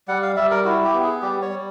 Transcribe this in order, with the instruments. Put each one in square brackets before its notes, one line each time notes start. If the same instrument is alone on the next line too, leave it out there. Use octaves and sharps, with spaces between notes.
[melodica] G3 F#5
F5
G3 E5
A#4
E4 F#4
G4
B3
G#4
G3 G4
C#5
G3